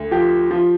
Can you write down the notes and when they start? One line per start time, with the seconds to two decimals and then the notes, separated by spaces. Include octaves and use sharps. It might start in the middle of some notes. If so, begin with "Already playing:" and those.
Already playing: D2
0.11 F3 G4
0.51 F3